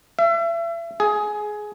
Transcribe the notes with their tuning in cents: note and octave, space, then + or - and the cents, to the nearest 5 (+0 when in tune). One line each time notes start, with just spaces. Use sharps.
E5 +35
G#4 +15